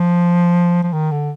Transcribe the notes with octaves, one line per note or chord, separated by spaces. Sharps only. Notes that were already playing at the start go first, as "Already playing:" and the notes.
Already playing: F3
F3
D#3
D3